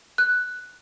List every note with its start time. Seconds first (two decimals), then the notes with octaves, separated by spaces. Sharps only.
0.18 F#6